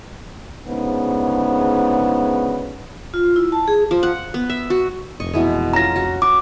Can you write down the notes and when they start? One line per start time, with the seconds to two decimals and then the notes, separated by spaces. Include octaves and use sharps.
0.67 D2 G#2 C#3 B3
3.14 F4
3.36 E4
3.52 A5
3.68 G#4
3.91 F3
4.03 F#5
4.34 B3
4.50 E5
4.70 F#4
5.20 F1 D#5 C#6
5.34 B2 E3 G#3
5.73 C#4 F4 A#5 A#6
5.96 F#4
6.22 F#4 D6